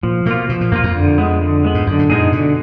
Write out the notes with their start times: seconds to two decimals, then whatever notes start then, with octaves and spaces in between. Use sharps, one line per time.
0.03 A#2 F3
0.26 B2 A#3 F4
0.49 B2 F3
0.61 A#2
0.72 F#2 A#3 F4
0.84 F2
0.95 D3
1.18 G#3 B3
1.41 D3
1.64 G#3 B3
1.75 G#2
1.86 F#2 D3
1.99 G#2
2.09 A#2 G#3 B3 D#4 G#4
2.32 B2 D3